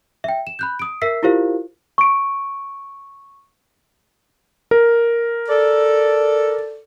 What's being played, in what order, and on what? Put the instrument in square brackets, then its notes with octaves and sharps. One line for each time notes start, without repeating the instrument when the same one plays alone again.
[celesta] E5 G5
E7
B5 F#6 G6
D#6 D7
A#4 E5 E6 B6 C7
E4 F4 G4 A#4 C5 F5
C#6 D7
[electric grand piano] A#4
[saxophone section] A4 D5